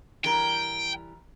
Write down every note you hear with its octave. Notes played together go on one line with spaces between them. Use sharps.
E3 G3 A#4 G5